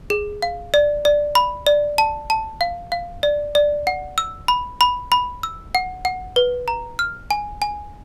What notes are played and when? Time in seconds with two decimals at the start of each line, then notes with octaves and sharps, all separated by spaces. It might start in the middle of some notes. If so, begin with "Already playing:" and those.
0.10 G#4
0.42 F5
0.74 D5
1.05 D5
1.35 B5
1.67 D5
1.98 A5
2.30 A5
2.61 F5
2.92 F5
3.23 D5
3.55 D5
3.87 F#5
4.18 E6
4.48 B5
4.81 B5
5.12 B5
5.43 E6
5.75 F#5
6.05 F#5
6.36 B4
6.68 A#5
6.99 F6
7.31 G#5
7.62 G#5